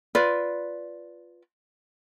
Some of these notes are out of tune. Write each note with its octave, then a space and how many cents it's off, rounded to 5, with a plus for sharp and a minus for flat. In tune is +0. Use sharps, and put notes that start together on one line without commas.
F4 +0 B4 +0 D5 -10